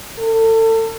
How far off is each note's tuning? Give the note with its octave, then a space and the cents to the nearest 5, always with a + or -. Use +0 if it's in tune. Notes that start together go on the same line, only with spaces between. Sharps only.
A4 +35